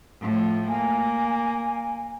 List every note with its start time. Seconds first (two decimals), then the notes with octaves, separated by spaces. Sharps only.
0.21 A2 F3
0.68 A#3 G#5